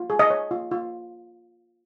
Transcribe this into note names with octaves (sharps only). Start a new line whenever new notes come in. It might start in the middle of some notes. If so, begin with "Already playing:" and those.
Already playing: F4
G#4
D#5
C#5
F4
F4